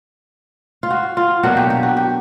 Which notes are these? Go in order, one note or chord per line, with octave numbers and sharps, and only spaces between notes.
F4
F#4
F4
B2 F#3 A#3 D4 F#4
G4
G4
F#4
G4